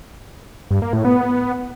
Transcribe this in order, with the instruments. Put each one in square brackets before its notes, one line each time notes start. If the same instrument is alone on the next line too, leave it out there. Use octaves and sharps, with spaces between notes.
[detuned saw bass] G2
A#3
A2
B3